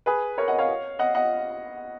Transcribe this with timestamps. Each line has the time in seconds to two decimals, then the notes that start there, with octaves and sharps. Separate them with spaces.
0.06 G#4 B4
0.38 A#4 C#5
0.48 D#5 F#5
0.58 C#5 F5
0.99 D#5 F#5
1.15 D#5 F#5